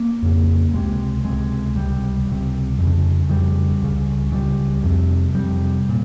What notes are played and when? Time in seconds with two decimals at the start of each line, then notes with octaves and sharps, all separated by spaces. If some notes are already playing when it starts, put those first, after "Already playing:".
Already playing: A#3
0.22 F2 C#3
0.73 C#2 C3 G#3
1.24 C#2 C3 G#3
1.75 C#2 C3 G3
2.27 C#2 C3
2.79 F2 C#3
3.30 F2 C#3 G3
3.82 C#2 C#3
4.32 C#2 C#3 G3
4.83 F2 C3
5.35 F2 C3 G3
5.89 A#2